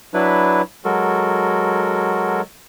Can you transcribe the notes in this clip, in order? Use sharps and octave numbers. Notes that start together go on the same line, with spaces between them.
F#3 D4 E4 B4
F#3 G#3 F#4 A4 A#4